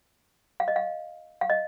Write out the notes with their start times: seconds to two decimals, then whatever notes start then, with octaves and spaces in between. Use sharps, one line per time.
0.60 F5
0.68 D#5
0.76 F5
1.41 F5
1.50 D#5